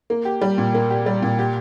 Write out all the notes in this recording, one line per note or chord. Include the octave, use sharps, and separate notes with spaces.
A#3
G4
G3
A#2
A#3
G4
G3
A#2
G4